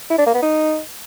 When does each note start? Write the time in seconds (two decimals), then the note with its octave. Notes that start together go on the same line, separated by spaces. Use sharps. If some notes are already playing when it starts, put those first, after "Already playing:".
0.10 E4
0.18 D4
0.26 A#3
0.34 B3
0.42 D#4